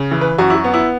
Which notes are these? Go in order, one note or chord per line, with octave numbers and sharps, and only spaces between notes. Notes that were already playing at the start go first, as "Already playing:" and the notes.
Already playing: C#3
E3
B4
F#2 F#4
E4
F#4
B3
E4